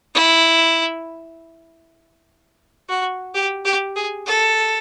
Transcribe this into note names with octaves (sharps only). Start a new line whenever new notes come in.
E4
F#4
G4
G4
G#4
A4